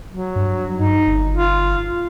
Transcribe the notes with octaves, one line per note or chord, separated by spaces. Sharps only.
F#3
G2
D#4
G1
F4